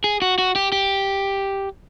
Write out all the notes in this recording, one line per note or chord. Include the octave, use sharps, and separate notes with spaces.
G#4
F#4
F#4
G4
G4